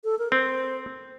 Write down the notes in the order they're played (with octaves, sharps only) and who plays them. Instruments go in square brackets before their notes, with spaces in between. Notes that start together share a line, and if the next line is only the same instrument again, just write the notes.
[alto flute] A4
A#4
[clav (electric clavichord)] C4 [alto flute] C5